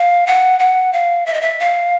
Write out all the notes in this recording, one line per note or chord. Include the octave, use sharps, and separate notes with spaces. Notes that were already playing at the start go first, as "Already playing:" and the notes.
Already playing: F5
F#5
F#5
F5
E5
D#5
E5
F5